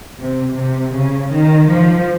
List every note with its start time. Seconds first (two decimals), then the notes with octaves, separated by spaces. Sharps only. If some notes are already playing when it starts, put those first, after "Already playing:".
0.20 C3
0.56 C3
0.94 C#3
1.31 D#3
1.69 F3